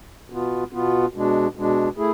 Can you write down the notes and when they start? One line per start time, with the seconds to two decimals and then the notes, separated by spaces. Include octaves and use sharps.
0.30 B2 B3 F4
0.72 B2 B3 F4
1.14 B2 G#3 D4
1.56 B2 G#3 D4
1.97 A3 E4 G#4